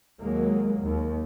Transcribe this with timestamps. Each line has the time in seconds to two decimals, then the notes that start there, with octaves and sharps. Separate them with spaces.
0.21 D#2 F#3 G#3 A#3
0.81 D#2